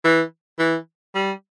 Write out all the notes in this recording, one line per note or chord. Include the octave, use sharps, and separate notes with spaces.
E3
E3
G3